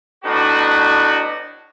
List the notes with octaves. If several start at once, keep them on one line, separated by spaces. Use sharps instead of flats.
A2 B3 D4 D#4 F#4